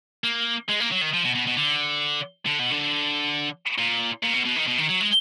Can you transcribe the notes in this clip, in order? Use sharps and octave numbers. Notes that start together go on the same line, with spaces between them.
A#3
G#3
A#3
F#3
D#3
F3
B2
B2
B2
D3
D3
B2
D3
A#2
A#2
B2
B2
D#3
B2
D#3
F#3
G#3